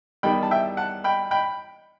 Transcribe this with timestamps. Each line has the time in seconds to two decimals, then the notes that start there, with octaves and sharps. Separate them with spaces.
0.23 E2 D#3 G3 G5 B5
0.43 A5
0.51 E5 G5
0.77 F#5 A5
1.04 G5 B5
1.31 G5 B5